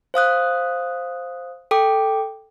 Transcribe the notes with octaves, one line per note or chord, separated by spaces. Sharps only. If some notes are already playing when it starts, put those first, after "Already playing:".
C5 F5 D#6 F#6
A4 G5 D6